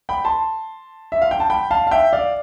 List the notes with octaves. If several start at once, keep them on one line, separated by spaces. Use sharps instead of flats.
G5 B5
A5 C6
E5
F5
G5
A5
G5 B5
F5 A5
F5
E5 G5
D5 F5